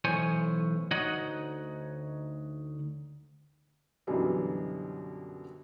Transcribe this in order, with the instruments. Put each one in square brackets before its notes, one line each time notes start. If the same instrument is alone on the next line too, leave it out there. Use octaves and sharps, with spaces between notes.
[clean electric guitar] B1 A2 E3 C5 C#5 G#5
D2 D#4 F#4 C#5 D#5 F#5
[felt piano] F#2 B2 D3 E3 F#3 G3